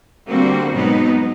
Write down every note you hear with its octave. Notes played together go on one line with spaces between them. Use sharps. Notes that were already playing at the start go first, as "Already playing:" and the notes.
D3 G3 A#3 C4 F#4
G#2 B2 F#3 B3 D#4